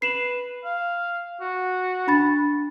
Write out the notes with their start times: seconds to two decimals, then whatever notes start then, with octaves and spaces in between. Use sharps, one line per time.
0.02 B4 C7 E7 F#7
0.64 F5
1.40 F#4
2.07 D4 B5 A6